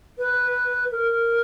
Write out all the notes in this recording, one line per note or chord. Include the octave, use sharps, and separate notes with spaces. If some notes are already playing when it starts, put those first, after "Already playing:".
B4
A#4